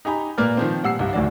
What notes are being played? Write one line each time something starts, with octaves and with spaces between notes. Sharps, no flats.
D#4 G4 G#5 A#5 B5
A#2 A#3 A#4 B4 D5 F6
D#3 F3 C4
A#2 G3 F#5 E6 C7
C2 G2
D1 D2 A2 D#3 F#4 D5